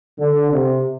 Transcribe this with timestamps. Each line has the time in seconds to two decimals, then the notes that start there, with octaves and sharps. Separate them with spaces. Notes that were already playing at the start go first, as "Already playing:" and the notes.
0.19 D3
0.52 C3